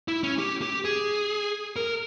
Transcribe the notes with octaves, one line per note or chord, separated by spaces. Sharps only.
E4
C#4
G4
G4
G#4
A#4